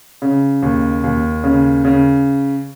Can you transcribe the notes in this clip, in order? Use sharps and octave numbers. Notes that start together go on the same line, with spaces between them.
C#3
D#2
D#2
C#3
C#3